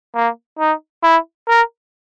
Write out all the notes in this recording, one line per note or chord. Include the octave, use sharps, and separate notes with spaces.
A#3
D#4
E4
A#4